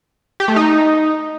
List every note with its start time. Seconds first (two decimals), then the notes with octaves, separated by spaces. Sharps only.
0.40 G4
0.48 A3
0.56 D#4